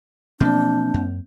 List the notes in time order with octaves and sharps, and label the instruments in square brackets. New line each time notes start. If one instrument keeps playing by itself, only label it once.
[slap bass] B2 F3 F#3 [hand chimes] A#3 C4 G6 [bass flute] D4
[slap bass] F#2